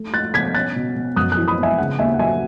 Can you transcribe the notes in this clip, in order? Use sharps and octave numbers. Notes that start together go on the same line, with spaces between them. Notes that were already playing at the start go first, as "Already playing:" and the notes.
Already playing: A3
A3 F#6 A6
B2 G#6 B6
C#4 F#6 A6
B2
B2
F#2 D#6 F#6
D#6 F#6
E3
B5 D#6
B3
E5 G#5
C#3 F#5
D#2 E5 G#5
F#5
F#3 E5 G#5